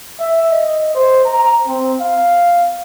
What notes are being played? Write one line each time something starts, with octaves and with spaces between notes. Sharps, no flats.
E5
D#5
C5
A#5
C4
F5